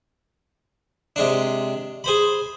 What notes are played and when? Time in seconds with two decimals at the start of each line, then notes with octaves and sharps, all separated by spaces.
1.16 C3 G#3 D4
2.04 G#4 C5 B5